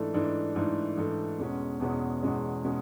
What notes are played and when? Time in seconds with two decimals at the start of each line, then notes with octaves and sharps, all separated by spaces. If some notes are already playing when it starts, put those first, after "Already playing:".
Already playing: G#2 E3 A3 D4 A4
0.14 G#2 E3 A3 D4 A4
0.55 G#2 E3 A3 D4 A4
0.97 G#2 E3 A3 D4 A4
1.39 E2 B2 G#3 C#4
1.80 E2 B2 G#3 C#4
2.22 E2 B2 G#3 C#4
2.64 B2 G#3 C#4